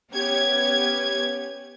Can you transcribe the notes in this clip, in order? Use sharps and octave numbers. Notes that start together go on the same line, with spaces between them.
B3 C#4 G4 C#5 G#6